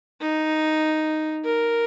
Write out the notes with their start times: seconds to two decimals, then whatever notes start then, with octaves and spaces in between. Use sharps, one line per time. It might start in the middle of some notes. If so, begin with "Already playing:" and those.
0.21 D#4
1.45 A#4